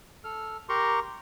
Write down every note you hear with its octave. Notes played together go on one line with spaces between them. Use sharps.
A4 F6
G4 A#4 A#5 C6 C#6